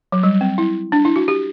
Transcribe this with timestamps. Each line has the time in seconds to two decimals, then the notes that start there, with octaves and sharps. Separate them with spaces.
0.12 F#3
0.24 G3
0.41 C4
0.58 E4
0.92 D4
1.05 E4
1.16 F#4
1.28 G4